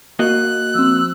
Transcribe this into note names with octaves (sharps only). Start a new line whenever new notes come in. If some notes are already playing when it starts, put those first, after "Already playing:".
A#3 F#4 D#5 F#6
F3 C4 E6